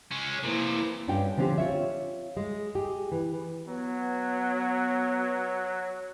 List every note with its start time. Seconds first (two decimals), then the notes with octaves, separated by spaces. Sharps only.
0.11 G#3 C#4
0.44 C3 E3 F3 A#3
1.08 G2 C#4 D4 F4 G5
1.37 D3 F3 C4 C#4 G4
1.58 F4 C#5 E5
2.37 G#3
2.75 G4 G#4
3.12 E3
3.68 F#3 B3